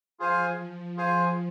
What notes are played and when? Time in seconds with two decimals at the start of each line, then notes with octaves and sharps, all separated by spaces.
0.19 F3 F4 G#4 C5 F5 G#5
0.97 F4 G#4 C5 F5 G#5